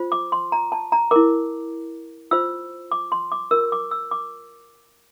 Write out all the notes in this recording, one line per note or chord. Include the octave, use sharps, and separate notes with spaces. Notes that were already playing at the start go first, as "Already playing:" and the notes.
Already playing: F4 C5
D6
C6
A#5
A5
A#5
E4 A#4 D6
F4 C5 E6
D6
C6
D6
F4 A#4 E6
D6
E6
D6